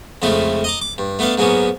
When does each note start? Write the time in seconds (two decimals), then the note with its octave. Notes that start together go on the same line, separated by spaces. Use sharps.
0.22 F2 C#3 G#3 A3 E4 F4
0.64 D#5 A#5 D6
0.81 D6
0.98 G2
1.19 A3 B3 D4 A4 F5
1.38 G#2 F#3 G#3 A#3 B3 C#4